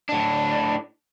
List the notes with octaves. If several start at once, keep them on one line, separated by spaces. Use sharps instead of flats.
A2 D4